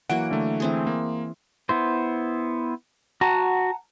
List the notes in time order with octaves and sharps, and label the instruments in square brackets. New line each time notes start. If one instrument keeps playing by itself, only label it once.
[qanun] E3 F#3 A#3 [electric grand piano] F#5 D7
[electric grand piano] D3 A3
[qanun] E3 C4 G#4
[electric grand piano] A#3
[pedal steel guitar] B3 E4 C5
[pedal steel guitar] F#4 [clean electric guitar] F#5 A5 A#5